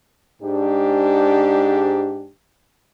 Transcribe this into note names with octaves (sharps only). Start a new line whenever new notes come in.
G#2 D4 G4